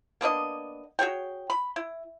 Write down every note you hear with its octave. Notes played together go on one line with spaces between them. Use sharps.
A#3 B3 D4 D#5
F#4 G#4 C#5 G5
B5
E4